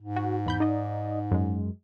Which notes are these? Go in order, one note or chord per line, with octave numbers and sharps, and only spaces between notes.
G#2
F#4
E2 B5 G6
D#4 D5 D#5
F#2 G#3